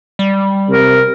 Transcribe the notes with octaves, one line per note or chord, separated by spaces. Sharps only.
G3
C3 A#4